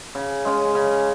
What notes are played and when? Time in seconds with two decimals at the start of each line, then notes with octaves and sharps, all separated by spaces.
0.15 C#3
0.45 G#3 C#4
0.75 C#3